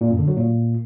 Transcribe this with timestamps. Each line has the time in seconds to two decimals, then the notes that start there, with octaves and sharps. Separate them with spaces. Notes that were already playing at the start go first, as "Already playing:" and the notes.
0.01 A#2
0.10 F#2
0.19 D3
0.28 F#3
0.37 A#2